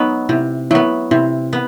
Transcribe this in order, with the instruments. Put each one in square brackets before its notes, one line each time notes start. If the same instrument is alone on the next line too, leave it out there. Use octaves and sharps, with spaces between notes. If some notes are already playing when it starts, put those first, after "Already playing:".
Already playing: [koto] F#3 B3 [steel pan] D#4
[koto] C3 [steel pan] E4
[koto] F#3 B3 [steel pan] E4
[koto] C3 [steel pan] E4
[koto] B3